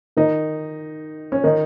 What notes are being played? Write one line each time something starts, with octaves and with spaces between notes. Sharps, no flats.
D#3 D#4
C#4
D#3 D#4